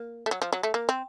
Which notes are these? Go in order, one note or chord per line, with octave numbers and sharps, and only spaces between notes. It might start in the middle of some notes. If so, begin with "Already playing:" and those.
Already playing: A#3
A3
F#3
F3
F#3
A3
A#3
C4